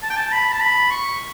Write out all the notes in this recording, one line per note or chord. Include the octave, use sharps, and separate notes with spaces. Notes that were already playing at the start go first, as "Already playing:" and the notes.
A5
G5
A5
B5
A5
B5
C#6